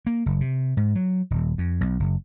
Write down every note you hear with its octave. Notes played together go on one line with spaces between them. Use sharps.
A#3
F#1
C3
G#2
F#3
D#1
F2
B1
F#1